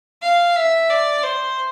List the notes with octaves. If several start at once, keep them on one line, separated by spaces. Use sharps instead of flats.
F5
E5
D5
C5